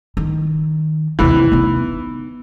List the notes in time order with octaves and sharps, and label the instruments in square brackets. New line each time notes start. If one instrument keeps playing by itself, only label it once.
[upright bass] D#3
[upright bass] D#2 C3 [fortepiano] E3
[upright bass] B3 D#4